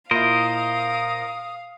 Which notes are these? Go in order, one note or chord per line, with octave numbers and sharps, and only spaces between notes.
A#2 E4 A#4 C5 D#5 F5 D#6